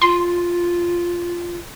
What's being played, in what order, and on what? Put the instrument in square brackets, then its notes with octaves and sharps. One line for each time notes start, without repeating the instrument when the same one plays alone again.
[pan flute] F4 [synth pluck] C6